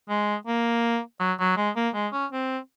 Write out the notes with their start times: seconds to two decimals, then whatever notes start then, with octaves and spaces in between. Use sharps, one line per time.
0.09 G#3
0.47 A#3
1.20 F#3
1.39 F#3
1.57 G#3
1.76 A#3
1.95 G#3
2.13 C#4
2.32 C4